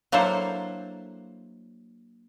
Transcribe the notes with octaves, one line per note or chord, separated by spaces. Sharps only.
F#3 A#3 D4 E4 A4 C5